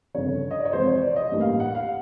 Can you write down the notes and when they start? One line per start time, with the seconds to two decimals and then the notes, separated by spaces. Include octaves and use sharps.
0.14 G1 F2 C#3 C#5
0.51 D#5
0.58 D5
0.65 C#5
0.73 F2 C3 E3 G#3 C5
0.88 C#5
1.02 D5
1.16 D#5
1.31 A1 G2 E3 G3 A#3
1.41 F5
1.60 F#5
1.75 F5